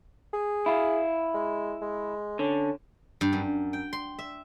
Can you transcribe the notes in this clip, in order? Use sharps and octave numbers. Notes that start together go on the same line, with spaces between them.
G#4
E4 F5
G#3
G#3
D3 C#4
G2
F#2
G5
C6
E5